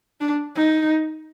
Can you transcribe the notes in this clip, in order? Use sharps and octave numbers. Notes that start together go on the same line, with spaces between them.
D4
D#4